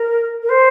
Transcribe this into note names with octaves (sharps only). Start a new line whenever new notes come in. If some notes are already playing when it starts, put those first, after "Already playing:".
Already playing: A#4
A#4
C5